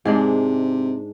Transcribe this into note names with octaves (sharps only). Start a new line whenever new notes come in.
G#2 C3 G#3 D4